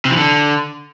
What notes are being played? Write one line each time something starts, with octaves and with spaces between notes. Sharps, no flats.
C3
E3
D3